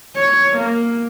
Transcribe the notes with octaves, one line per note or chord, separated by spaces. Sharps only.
C#5
A#3